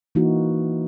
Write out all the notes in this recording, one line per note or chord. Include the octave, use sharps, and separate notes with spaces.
E3 A#3 D#4 E4 F#4